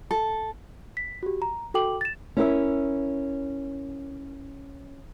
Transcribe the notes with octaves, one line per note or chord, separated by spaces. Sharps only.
A4
B6
F#4 G4
A#5
F#4 A4 G5 D6 F#7
A6 E7
C#4 E4 A#4 E5